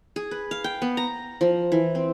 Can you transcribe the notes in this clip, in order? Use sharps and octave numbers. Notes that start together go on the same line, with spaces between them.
G#4
B4
F5
G5
B3
A#5
F3
E3
C4